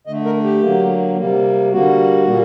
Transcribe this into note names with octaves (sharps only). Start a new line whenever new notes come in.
D3 A3 D#5
A#4
G4
D3 F#3 A#3
C3 G3 A#3
D3 G3 A#3 F#4
A#2 G3 A#3